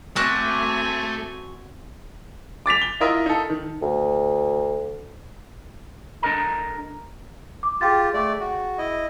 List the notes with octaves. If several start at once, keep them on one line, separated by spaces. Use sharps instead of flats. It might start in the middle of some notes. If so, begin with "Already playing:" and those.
A3 C4 F#4 G#5 D6 F#6
D6 A6 B6 F7
G7
E4 F4 A#4 D#5 E5
D#4 A4
D#3
D2
D4 A4 A#4 D#5 A#5
D6
F4 G4 G#4 G5 A6
A3 D5
F#4
E4 D#5